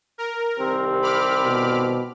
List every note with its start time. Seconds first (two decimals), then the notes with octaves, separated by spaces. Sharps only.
0.18 A#4
0.58 C2 D#3 C4 G4
1.02 B5 D6 F6
1.44 B2